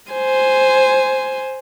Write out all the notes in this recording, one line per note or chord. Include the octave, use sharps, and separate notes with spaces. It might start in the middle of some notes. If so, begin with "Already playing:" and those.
C5 G#5